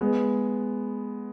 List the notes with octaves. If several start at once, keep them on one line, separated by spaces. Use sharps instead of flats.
G#3 B3